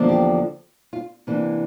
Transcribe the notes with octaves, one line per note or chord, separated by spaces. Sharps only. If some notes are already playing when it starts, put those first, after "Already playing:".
Already playing: E2 D3 F3 A#3 D4
G4
F4
C3 E3 A#3 D4